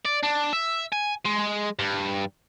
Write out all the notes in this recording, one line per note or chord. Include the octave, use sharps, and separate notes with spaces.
D5
D4
E5
G#5
G#3
G2